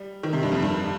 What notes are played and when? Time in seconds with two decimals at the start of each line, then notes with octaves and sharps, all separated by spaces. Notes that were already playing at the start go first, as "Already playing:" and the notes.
Already playing: G3
0.23 D#3
0.33 C3
0.43 G2
0.52 F2
0.62 G2